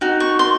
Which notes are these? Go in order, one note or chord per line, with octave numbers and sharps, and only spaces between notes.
D#4 F#4
C#6
C6